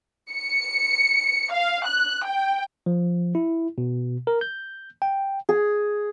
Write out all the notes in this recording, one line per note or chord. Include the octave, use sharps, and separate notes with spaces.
C#7
F5
F#6
G5
F3
E4
B2
A#4
G6
G5
G#4